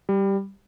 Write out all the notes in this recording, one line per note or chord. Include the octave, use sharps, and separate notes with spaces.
G3